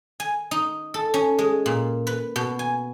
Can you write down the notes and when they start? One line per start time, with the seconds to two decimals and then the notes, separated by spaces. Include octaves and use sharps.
0.20 G#5
0.51 D#4
0.94 A4
1.14 C#4
1.39 G#3
1.66 A#2
2.07 B4
2.36 B2
2.59 G#5